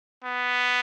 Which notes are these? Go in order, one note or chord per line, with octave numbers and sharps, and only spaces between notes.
B3